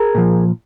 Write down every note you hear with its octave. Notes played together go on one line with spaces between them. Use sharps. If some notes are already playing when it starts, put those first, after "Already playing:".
Already playing: G#4 A#4
A#2 F3